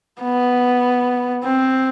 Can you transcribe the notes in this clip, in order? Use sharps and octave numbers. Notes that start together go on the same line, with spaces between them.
B3
C4